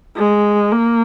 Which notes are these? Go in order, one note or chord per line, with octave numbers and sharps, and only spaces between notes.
G#3
A#3